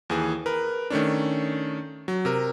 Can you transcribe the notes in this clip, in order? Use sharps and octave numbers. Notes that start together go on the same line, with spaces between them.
D#2 E3 G#4
A#4 B4
D#3 A3 C#4 D4
F#3
C3 A#4